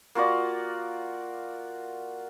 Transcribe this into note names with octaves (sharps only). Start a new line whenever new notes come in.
A#3 F4 F#4 D5